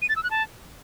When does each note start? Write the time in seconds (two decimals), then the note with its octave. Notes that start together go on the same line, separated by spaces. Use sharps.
0.02 D#7
0.09 A6
0.16 E6
0.23 F#6
0.31 A5